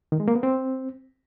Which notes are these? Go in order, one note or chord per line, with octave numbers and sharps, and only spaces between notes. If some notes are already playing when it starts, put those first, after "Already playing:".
D#3
G#3
A#3
B3
C4